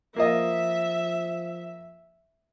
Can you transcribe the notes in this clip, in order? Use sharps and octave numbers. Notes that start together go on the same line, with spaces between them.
F3 A#3 F4 D#5 E5